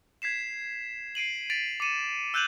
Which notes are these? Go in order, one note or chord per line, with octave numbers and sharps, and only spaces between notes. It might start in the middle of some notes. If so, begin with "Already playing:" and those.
G#6 B6 C7 E7
C7 D7 D#7 F#7
A6 B6 D7 F7
D6 C#7 D#7 E7
E6 F#6 G6 D#7 F7 F#7